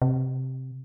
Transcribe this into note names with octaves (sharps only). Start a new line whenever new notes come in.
C3